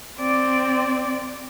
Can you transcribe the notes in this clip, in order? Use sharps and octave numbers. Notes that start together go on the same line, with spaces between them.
C4 D5